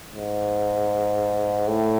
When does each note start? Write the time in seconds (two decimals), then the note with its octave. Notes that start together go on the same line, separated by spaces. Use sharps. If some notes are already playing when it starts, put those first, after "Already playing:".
0.15 G#2
1.67 A2